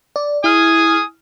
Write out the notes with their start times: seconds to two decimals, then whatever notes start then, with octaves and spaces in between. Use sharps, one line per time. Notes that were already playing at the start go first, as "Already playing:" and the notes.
0.16 D5
0.44 E4 G#5 D#6 F6